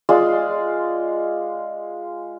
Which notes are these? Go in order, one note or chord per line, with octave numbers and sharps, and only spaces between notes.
G#3 F4 D5